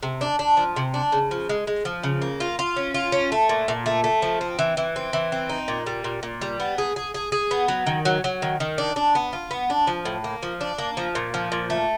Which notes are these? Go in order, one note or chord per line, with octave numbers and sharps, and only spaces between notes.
C3
D4
D4
F3
C3
D4
C#3
F3
G#3
G#3
F3
C#3
A#3
F4
F4
C#4
F4
C#4
A3
A#2
A#2
A3
A3
F3
C4
E3
E3
C4
E3
C4
D#4
A#2
G3
A#2
A#2
G3
B3
G#4
G#4
G#4
G#4
B3
F#3
D#3
F#3
F#3
D#3
D#3
D4
D4
B3
F4
B3
D4
F3
A2
A#3
F3
D4
A#3
F3
A#2
F3
A#2
A3